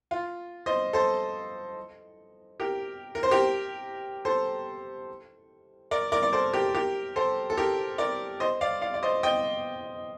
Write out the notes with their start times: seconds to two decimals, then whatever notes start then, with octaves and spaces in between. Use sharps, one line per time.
0.11 F4
0.66 C5 D#5
0.93 A4 C5
2.60 G4 A#4
3.15 A#4
3.23 C5
3.31 G4 A#4
4.25 A4 C5
5.91 A#4 D5
6.12 A#4 D5
6.23 D5
6.33 A4 C5
6.53 G4 A#4
6.75 G4 A#4
7.16 A4 C5
7.50 A4
7.57 G4 A#4
7.98 A#4 D5
8.40 C5 D#5
8.61 D5 F5
8.82 D5 F5
8.94 D5
9.03 C5 D#5
9.23 D#5 G5